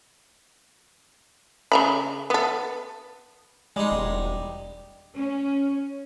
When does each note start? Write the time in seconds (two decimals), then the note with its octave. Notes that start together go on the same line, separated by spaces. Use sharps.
1.72 C#3 A#5 B5
2.30 B3 A4
3.76 G3 G#3 D#4
3.91 E1
5.15 C#4